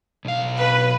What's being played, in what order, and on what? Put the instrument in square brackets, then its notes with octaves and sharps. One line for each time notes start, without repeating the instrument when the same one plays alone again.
[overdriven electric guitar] B1 F5
[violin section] B4